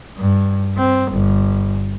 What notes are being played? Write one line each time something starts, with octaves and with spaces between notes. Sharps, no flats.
G2
C4
G1